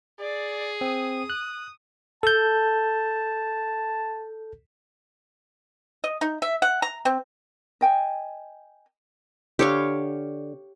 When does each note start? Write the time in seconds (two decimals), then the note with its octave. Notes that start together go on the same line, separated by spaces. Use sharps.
0.20 G#4 D5
0.81 C4 D#6
1.30 F#6
2.23 A4 A5 G6
6.04 D#5
6.21 D#4
6.42 E5
6.62 F#5
6.82 A#5
7.05 C4
7.81 D#5 G5 G#5
9.59 D3 G4 C#5 F5